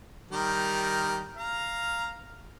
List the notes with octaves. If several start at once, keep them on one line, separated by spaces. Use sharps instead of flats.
D#3 G3 A#4
F5 A#5